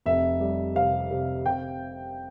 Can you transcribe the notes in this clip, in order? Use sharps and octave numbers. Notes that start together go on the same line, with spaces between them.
F1 E5
G3
C3 F5
C3
C3 G5